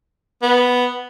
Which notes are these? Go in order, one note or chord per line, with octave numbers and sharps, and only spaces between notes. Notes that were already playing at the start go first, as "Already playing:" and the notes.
B3